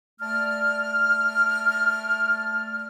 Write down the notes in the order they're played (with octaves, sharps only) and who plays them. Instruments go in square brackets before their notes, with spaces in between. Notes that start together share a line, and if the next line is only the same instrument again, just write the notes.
[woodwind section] A3 D5 A5 F6